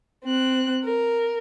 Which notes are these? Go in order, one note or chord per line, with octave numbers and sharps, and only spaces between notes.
C4 F#6
A#4